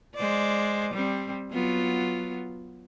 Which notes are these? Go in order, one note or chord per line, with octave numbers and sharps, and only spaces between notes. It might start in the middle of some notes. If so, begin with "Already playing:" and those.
G#3 C5 D5
G3 C4
F#3 B3 F4